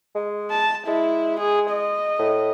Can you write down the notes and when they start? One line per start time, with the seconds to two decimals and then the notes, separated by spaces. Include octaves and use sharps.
0.15 G#3
0.51 A5
0.87 G#3 E4
1.40 G#4
1.71 D#5
2.19 A2